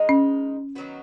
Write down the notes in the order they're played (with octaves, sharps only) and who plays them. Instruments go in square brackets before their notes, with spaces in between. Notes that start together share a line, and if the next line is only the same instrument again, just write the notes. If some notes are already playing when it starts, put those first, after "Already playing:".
Already playing: [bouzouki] D#3 G#3 D#4
[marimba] C#4
[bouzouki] D#3 F#3 B3 F#4